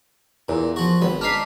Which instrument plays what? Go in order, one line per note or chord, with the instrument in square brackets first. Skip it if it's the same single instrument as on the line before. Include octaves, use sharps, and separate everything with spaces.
[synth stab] E2 [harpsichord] A#2
[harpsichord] F3 F#4
[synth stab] G#1 [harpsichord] B3
[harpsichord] D4 D#4 [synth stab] F6 B6 C7